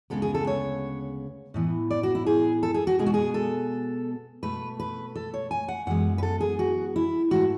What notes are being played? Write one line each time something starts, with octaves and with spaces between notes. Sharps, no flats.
D2 C#3 G#3 B3 A4
G#4
A4
C#5
A2 E3 B3
D5
F#4
E4
G#4
A4
G#4
F#4
B2 G#3 B3 G#4
F#4
G#4
A4
B2 A3 B4
B4
A4
C#5
G#5
F#5
F#2 E3 G#3 B3 F#5
B4
A4
G#4
F#4
E4
G#2 E3 A3 F#4